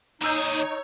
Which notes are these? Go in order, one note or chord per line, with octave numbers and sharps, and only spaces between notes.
D#2 D#4 G#4 C#5 A#5 E6 G6